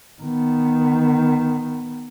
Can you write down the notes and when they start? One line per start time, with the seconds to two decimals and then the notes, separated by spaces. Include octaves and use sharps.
0.22 D#3 B3